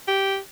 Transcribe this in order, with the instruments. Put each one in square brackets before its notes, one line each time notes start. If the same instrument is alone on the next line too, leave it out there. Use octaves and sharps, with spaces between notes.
[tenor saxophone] G4